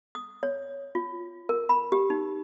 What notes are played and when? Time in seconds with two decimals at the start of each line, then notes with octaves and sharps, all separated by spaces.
0.15 D#6
0.43 C#5
0.95 F4
1.49 A#4
1.69 B5
1.92 G4
2.10 D#4